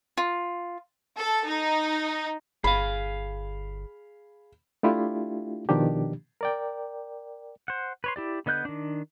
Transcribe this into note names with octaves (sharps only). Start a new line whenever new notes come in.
F4
A4
D#4
G1 G#4 F5 B5
A3 D4 E4 F4 G4
B2 D#3 F3 D4 G4
A#4 D5 G5
C5 F#5
B4 C#5 C6
E4 G4 D5
D3 B3 D#5 F#6 G6
D#3 D4